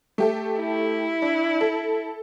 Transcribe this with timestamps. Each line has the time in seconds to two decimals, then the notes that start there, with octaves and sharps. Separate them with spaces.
0.18 A3 G4 A4
0.60 E4
1.22 D4
1.61 A4